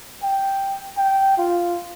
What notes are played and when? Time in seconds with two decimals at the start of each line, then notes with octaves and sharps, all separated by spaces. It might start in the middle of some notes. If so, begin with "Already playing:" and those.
0.23 G5
0.98 G5
1.38 F4